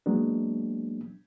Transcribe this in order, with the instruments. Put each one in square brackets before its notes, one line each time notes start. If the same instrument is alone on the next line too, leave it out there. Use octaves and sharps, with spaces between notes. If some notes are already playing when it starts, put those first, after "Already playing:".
[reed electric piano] F#3 G#3 A#3 B3 D4